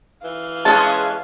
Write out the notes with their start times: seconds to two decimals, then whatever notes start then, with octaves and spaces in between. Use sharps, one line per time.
0.24 E3 F5
0.65 G#3 C#4 G#4 A5